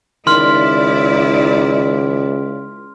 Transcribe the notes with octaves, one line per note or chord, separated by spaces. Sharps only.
C#2 D#3 E4 D5 C6 F6